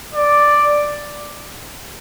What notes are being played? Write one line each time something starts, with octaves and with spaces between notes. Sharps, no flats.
D5